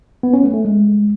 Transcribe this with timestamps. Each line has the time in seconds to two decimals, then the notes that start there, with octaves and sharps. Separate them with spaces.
0.23 B3
0.33 C#4
0.44 A3
0.54 A3
0.65 G#3